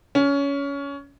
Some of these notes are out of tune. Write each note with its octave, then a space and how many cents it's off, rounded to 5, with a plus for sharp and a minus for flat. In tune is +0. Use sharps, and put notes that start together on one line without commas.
C#4 +20